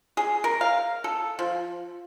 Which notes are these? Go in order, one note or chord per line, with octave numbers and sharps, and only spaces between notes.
G#4
A#4
F5
A4
F3